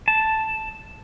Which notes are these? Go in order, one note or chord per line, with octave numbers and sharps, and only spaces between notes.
A5